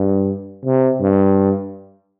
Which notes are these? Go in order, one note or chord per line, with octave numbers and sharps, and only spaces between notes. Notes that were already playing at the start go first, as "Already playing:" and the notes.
Already playing: G2
C3
G2